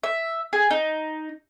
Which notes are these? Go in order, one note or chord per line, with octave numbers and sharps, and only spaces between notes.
E5
G#4
D#4